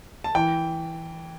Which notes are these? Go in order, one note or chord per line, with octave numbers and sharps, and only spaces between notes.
A5
E3 G5